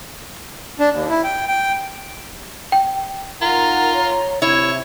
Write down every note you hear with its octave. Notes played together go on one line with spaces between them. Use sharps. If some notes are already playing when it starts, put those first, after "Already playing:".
D4
D#2
E4
G5
G5
G5
D#4 F4 A#4 F#5 A#5
C#5
C3 E4 C#5